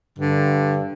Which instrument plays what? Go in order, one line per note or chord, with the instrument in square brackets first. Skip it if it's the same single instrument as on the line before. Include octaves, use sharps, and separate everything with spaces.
[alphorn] G2 [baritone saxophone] D3